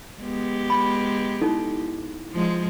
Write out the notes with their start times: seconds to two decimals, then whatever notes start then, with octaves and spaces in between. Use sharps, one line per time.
0.21 G#3 B3 G4
0.70 B5
1.42 D#4 E4 A4
2.33 F3 G#3